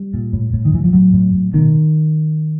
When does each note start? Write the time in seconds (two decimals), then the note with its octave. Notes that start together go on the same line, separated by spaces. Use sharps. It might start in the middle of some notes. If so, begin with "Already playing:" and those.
Already playing: G3
0.14 A#2
0.33 A2
0.53 A2
0.65 D#3
0.73 A2 E3
0.84 F3
0.93 A2 F#3
1.13 A2
1.33 A2
1.53 B2 D#3